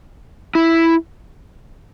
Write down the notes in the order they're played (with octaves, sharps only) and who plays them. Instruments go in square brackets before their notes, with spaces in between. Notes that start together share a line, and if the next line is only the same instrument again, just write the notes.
[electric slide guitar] E4